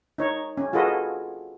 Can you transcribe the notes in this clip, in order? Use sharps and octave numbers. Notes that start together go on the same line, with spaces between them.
D#4 C#5
C#4
F4 F#4 G#4 A4 B4 D#5